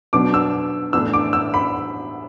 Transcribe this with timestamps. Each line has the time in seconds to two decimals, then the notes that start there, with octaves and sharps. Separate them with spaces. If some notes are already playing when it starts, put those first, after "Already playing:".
0.13 B2 F#3 B3 D4 D6
0.34 E6
0.93 A2 E3 B3 D4 E6
1.13 D6
1.33 E6
1.54 B5